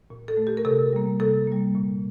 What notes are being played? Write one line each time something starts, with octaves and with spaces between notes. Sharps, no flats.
A#2
A4
A3
G4
A#4
C3 A4
G3 A#3
C3 A4
G3 A#3
A#2